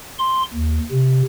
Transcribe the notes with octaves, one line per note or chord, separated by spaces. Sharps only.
C6
D#2
C3